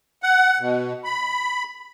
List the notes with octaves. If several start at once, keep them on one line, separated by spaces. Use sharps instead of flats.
F#5
B2
B5